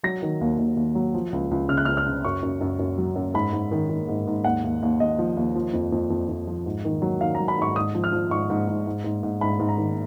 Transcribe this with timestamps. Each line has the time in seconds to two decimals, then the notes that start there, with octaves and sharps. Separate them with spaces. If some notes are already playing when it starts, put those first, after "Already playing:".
0.03 F#3 A#6
0.22 D#3
0.41 D#2
0.58 D#2
0.77 D#2
0.95 F#3
1.14 F3
1.32 C#2
1.51 C#2
1.68 C#3 F6
1.77 F#6
1.85 C#2 F6
1.97 F6
2.06 C#3
2.24 F#2 C#6
2.43 F#2
2.61 F#2
2.79 F#2
2.98 F#3
3.16 F#2
3.34 G#2 B5
3.53 G#2
3.71 D#3
3.90 D#3
4.08 G#2
4.27 G#2
4.44 D#2 F#5
4.64 D#2
4.82 D#2
5.00 D#2 D#5
5.18 F3
5.36 D#2
5.55 F3
5.73 F2
5.92 F2
6.10 F2
6.29 F2
6.47 F3
6.66 G#2
6.85 D#3
7.02 F#3
7.21 D#3 F5
7.35 A#5
7.40 F#3
7.48 B5
7.58 G#2 C#6
7.76 G#2 D#6
7.95 F3
8.04 F6
8.12 F3
8.31 G#2 C#6
8.50 G#2
8.68 G#2
8.87 G#2
9.04 G#2
9.23 G#2
9.41 G#2 B5
9.59 G#2
9.69 A#5
9.78 D#3